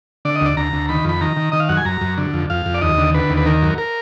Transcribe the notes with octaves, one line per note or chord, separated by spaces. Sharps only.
D3 D5
D#5
D2 D5
D2 A#5
D2
D#3 B5
F2 B5
D#3 A#5
D#3
D#3 D#5
F5
F#2 F#5
G#5
F#2 A#5
F#2
D3
F2
F2 F5
F2
D5
D#2 D#5
D3
D3 B4
D#2
B4
D#3 A#4
F#2
A#4